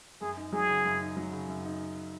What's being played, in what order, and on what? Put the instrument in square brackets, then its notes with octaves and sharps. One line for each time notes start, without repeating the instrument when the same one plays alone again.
[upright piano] F#2 [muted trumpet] G#4
[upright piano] D#4
[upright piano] F#3 [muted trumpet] G#4
[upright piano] C#3
F#2
D#4
F#3
C#3
F#2
D#4